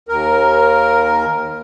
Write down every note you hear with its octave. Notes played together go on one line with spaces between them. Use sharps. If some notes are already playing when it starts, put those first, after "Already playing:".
D#2 A#4